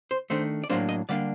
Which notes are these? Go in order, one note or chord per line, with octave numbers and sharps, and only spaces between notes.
C5
D#3 A3 D4 C5
D5
A2 F#3 A#3 D4 C5
D#5
D3 G3 A#3 D4 D5